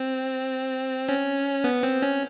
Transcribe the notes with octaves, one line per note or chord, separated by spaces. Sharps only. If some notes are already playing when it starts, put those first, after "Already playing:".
Already playing: C4
C#4
B3
C4
C#4